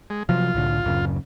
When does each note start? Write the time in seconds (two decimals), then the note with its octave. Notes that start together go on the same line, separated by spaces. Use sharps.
0.10 G#3
0.29 C3 F3 F#3 F4
0.54 C2 A2 D3
0.84 D1 F#2 C#3